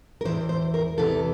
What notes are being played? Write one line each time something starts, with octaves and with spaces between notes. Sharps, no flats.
A#4
E2 C3 E3 C5
C5
A#4
E2 C3 E3 A4